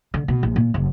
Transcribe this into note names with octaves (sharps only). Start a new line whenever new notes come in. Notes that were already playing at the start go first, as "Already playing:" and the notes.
D3
B2
A#1
A#2
F#1